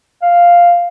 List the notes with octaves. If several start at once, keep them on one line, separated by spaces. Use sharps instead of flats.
F5